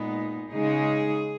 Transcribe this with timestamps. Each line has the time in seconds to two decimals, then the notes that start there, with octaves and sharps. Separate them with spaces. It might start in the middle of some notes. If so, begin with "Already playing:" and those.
Already playing: A#2 G#3 B3 D#4
0.51 C#3 G#3 D#4 G#4